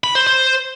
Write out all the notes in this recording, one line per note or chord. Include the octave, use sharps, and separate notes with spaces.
B5
C5
C5